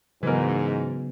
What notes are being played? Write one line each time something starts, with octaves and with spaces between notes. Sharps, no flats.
G#2 C#3 E3 F#3 B3 A#4